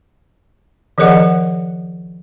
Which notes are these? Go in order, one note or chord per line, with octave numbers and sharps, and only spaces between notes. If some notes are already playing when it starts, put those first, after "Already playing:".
D#3 F3 G#4 A#4 D#5 F#5